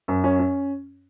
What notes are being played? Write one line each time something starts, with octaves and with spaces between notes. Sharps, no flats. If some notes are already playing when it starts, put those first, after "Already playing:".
F#2
C#4
C#4